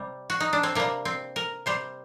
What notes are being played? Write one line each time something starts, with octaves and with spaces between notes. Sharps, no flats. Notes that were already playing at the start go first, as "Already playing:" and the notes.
Already playing: C3 G3
F#4
D#4
D4
C4
C3 G3 A#3
C4
A#4
C3 G3 C5